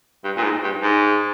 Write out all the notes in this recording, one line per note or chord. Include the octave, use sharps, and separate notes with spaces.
G2
A#2
G#2
G2
G#2